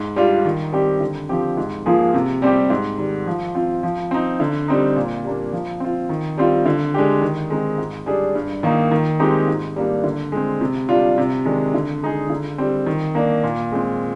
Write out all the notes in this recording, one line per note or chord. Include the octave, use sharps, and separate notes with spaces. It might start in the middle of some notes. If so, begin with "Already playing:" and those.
Already playing: G#2
G3 D4 F4
D#3
G3 C4 G4
D3
F3 C4 G4
G#2
F3 A#3 F4 G#4
C3
G3 C4 G4
G#2
D#3 G3
F3
C4 F4
F3
C4 D#4
D3
G3 C4 D#4
A#2
G3 A#3 D4
F3
C4 F4
D#3
G3 C4 F4
D3
G#3 D4 G4
D#3
G#3 C4 D#4
G#2
G3 D4 G#4
G2
D#3 A#3 D#4
D#3
G#3 C4 D#4 G4
G#2
G3 A#3 D4
D3
G#3 C4
C3
G3 D4 F4
C3
D#3 G#3 D4
D3
G#3 D#4 G#4
D3
G3 C4
D#3
A#3 D4
A#2
G#3 C4